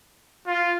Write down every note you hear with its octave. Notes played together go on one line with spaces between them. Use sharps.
F4